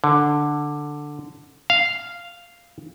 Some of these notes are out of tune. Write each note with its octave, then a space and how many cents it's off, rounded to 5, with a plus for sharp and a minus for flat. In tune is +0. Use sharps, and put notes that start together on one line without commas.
D3 +5
F5 -5